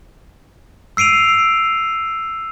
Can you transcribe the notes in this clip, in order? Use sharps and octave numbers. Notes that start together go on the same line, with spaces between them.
E6 C7 D7 D#7 F7